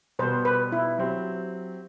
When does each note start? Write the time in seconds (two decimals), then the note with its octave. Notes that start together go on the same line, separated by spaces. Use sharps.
0.19 B2 G3 B3 C5
0.45 B4
0.72 E4
0.98 F#3 C4 G4